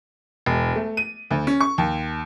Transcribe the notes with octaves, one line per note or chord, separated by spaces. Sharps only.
E1
A3
D#7
D2
C#4
C#6
D#2